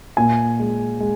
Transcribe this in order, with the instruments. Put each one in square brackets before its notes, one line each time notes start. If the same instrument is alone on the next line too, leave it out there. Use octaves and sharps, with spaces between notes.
[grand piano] A#2 G#5
G#3
G#3